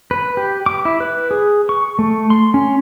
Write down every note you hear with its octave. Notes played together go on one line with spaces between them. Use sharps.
B4
G4
D6
E4
B4
G#4
C#6
A3
C6
C#4